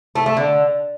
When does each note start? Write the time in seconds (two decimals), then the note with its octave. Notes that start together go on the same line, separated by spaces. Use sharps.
0.15 A3
0.26 A3
0.37 D3